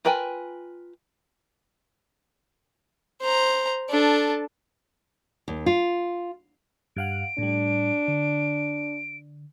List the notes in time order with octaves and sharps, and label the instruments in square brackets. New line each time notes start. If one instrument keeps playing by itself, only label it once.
[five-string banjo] F4 A#4 B4 G5 G#5
[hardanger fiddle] C5 A#5
D4 A4
[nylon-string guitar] D#2
F4
[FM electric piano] G2 F5 F#5 [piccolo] D7
[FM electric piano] A2 G3 [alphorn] D4
[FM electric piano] D3